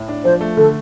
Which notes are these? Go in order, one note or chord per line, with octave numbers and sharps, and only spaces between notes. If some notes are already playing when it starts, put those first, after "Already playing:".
Already playing: A2
D4
F3 C5
A3
D3 A4